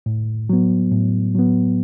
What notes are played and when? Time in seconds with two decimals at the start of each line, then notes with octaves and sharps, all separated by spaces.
0.06 A2
0.50 F#3 B3
0.92 A2
1.35 F#3 B3